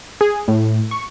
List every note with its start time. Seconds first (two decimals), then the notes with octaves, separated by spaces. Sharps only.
0.21 G#4
0.48 A2
0.91 C#6